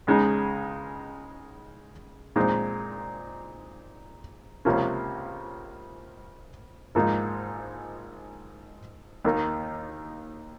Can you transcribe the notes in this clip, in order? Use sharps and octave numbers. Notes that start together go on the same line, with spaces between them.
C#2 C#3 G#3 D#4
A#2 G#3 C4 D#4
C#2 C3 F3 A#3 C#4
G#1 G#2 F3 A#3 D#4
D#2 D#3 A#3 D#4